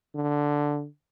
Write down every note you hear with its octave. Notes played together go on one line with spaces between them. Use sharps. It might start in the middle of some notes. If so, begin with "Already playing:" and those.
D3